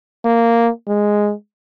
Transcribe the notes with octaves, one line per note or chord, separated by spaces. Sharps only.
A#3
G#3